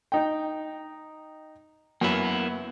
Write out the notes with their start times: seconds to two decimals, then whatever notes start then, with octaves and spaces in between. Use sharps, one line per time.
0.12 D#4 G5
2.01 F#2 A#3 B3 E4